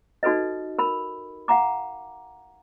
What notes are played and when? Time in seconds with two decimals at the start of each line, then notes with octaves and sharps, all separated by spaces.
0.23 D#4 F#4 A4 B4 D#5
0.79 A#4 B5
1.48 F5 F#5 A#5 D6